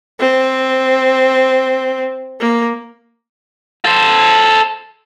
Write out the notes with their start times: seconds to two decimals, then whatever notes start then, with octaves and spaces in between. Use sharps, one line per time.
0.19 C4
2.40 A#3
3.85 A4 C5